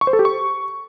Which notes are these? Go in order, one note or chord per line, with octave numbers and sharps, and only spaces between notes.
C#6
C5
A4
G4
C#6